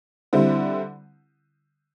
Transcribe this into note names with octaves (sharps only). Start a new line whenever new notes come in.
D3 G3 C4 E4